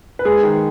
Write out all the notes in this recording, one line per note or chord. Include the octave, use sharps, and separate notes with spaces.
B4
G#3 G#4
D#3